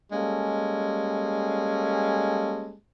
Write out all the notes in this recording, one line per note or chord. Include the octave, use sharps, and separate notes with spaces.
G3 G#3 A#3 C#4 A4